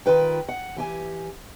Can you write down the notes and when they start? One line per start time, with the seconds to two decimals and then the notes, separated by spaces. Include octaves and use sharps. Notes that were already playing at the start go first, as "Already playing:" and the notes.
0.06 D#3 F4 B4 G5
0.48 F#5
0.77 E3 G4 G#5